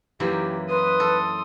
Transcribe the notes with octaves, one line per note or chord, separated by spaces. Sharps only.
F#2 E3 A#3 G4
B4 C6 D#6
A4